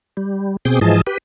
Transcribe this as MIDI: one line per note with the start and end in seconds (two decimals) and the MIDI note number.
0.17 0.56 55
0.65 0.79 47
0.65 0.79 60
0.65 0.79 68
0.65 0.79 86
0.65 0.79 87
0.65 0.79 91
0.81 1.01 44
0.81 1.01 52
0.81 1.01 53
0.81 1.01 68
0.81 1.01 75
0.81 1.01 81
1.07 1.18 67
1.07 1.18 71